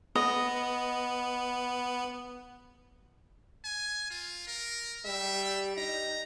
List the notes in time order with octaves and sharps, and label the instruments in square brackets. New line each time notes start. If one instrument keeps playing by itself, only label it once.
[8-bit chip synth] B3 [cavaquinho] D#5
[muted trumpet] G#5
F4
A#4
[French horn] G3 [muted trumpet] E5
[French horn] D#4 [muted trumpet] A#5